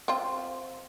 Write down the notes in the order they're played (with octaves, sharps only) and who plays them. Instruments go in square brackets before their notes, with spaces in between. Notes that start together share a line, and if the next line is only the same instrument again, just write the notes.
[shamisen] C4 F4